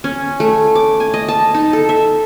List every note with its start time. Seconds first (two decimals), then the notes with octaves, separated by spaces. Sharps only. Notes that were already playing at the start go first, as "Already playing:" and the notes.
0.04 C#4
0.40 A3
0.75 D6
1.00 G#5
1.14 D#5
1.28 A5
1.54 D#4
1.73 A4
1.89 E5